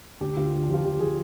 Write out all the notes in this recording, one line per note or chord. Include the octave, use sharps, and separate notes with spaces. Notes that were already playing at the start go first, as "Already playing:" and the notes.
D2 G4
D2 F4
D3 G4
G4
F3 F4
F3 G4
F3 G#4